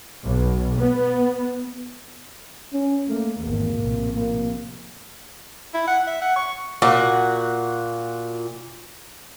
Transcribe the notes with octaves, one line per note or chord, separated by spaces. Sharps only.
B1
B3
C#4
A3 A#3
G#1 E2 A#3
A#1 A2 C3
A#3
E4
F#5
E5
F#5
C#6
A#2 F#4